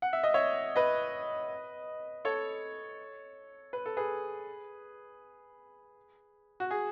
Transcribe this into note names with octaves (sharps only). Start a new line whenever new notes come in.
F#5
E5
D#5
C#5 E5
B4 D#5
A4 C#5
B4
A4
G#4 B4
F#4
G#4